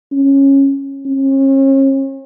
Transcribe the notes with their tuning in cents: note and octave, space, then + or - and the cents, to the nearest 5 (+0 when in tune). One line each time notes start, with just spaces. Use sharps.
C#4 -15
C#4 -40